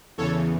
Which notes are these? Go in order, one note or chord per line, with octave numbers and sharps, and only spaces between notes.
E2 C#3 E3 A4 C#5